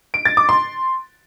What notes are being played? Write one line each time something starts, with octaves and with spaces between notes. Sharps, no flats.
D7
A6
D6
C6